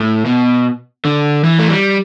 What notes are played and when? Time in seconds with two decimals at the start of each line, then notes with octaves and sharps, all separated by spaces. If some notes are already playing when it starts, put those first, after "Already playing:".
Already playing: A2
0.25 B2
1.05 D3
1.44 E3
1.59 A3
1.70 G3